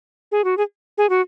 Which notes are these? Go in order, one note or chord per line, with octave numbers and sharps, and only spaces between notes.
G#4
F#4
G#4
G#4
F#4